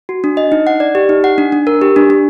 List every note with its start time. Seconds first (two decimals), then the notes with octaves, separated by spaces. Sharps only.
0.09 F#4
0.24 D4
0.37 D#5
0.52 D#4
0.67 F#5
0.80 D5
0.95 G4
1.09 D#4
1.24 F#5
1.38 D4
1.52 D4
1.67 A#4
1.82 G4
1.96 D4
2.10 D4